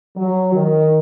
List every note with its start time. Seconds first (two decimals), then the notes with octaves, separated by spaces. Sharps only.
0.17 F#3
0.54 D#3